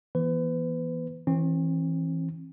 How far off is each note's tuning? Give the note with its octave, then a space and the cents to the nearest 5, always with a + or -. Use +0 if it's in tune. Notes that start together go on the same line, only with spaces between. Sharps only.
E3 +0 B3 -40 B4 +35
E3 -5 C4 +45